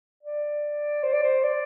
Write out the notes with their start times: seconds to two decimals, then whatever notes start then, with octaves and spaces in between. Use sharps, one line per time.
0.23 D5
1.04 C5
1.13 D5
1.22 C5
1.43 D5